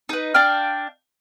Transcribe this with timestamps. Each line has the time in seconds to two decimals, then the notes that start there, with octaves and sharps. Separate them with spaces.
0.09 D#4 B4
0.34 D4 F5 G5 F6